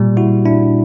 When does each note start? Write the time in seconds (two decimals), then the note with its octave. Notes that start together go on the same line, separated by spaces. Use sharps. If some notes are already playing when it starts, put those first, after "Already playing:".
Already playing: A#2 G3
0.17 E4 F#4
0.45 D4 E4